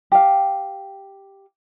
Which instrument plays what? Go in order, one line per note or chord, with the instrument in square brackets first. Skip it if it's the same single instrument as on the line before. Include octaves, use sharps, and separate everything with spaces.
[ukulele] G4 F5